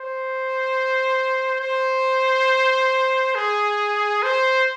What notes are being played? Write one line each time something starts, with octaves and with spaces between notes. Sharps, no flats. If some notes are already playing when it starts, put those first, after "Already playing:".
Already playing: C5
C5
G#4
C5